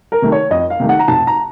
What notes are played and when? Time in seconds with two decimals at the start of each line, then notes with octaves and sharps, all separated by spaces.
0.12 A#4
0.22 C3 D#3 A3
0.32 C#5
0.51 F2 D#5
0.70 F5
0.80 C3 D#3 A3
0.89 F#5
0.99 A#5
1.08 F1 A5
1.27 A#5